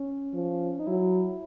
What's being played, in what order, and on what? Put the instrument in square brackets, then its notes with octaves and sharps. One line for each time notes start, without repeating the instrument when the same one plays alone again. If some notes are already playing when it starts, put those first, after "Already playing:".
Already playing: [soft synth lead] C#4
[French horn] F3
[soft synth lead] D#4
[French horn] F#3 [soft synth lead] E4